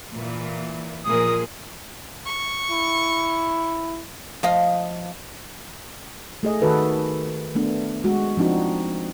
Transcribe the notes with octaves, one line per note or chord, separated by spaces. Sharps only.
A#2 E3
A#2 F3 G#4 A#4 D#6
C#6
E4
F3 D#5 F5
A3 G#4 D#5
D#3 F#4 A4 B4
A3 B3 D4
G#3 F#4
F3 C4 D4 D#4 F#4